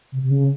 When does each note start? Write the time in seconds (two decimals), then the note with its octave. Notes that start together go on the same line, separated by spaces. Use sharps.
0.12 C3
0.23 C3
0.31 C#3